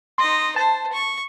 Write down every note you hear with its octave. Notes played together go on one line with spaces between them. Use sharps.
D#4 D#5 C6
C5 A5
C#6